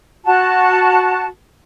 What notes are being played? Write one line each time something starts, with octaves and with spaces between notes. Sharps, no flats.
F#4 A5